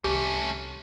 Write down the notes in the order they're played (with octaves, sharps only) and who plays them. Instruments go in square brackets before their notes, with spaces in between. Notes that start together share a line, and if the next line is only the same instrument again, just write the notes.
[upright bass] C2 D#3 [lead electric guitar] A3 C#4 [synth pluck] G4